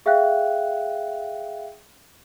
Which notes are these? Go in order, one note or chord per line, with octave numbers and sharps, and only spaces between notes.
G#4 E5 F5 G5 F#6